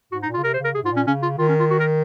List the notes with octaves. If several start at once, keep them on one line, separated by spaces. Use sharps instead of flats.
G#2 F#4
D#4
A#2
F4
C#3
C3 A#4
C5
C#3
A#4
C3 G#4
G#2 F4
A#2
C#4
C#3 C#4
F4
D#3 F4
C#4
F4
F#4
A#4